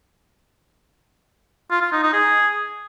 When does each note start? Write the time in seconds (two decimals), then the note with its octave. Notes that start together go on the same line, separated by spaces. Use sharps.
1.71 F4
1.81 F4
1.92 D#4
2.03 D#4
2.13 G#4